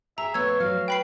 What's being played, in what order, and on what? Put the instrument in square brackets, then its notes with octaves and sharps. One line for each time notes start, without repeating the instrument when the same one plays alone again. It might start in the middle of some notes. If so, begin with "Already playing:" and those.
[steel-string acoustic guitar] G#4 [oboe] E5 [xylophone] A#5
[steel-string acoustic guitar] A3 B3 [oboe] C#5 [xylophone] E6 G#6
[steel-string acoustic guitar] F#3 [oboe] F5
[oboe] B4 [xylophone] G5 B5 C7